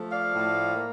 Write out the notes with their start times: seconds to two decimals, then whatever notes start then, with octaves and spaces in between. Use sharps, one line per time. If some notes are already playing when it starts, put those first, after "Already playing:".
Already playing: F3 A3
0.12 D5 F5
0.33 A2
0.76 A#3